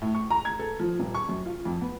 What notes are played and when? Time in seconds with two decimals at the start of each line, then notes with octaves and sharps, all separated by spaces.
0.02 A2
0.15 C#6
0.30 A#5
0.45 G#6
0.59 A4
0.79 F3
0.99 D#1
1.15 C#6
1.29 F#2
1.46 F4
1.65 F2
1.81 B3